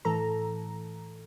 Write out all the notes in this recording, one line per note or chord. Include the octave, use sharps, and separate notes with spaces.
A2 E3 A4 A#5